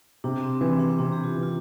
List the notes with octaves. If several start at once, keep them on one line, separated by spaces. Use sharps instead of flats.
C3 D4
C4
E3 C4
D4
C4
C3 D4
G4
F4
E3
F4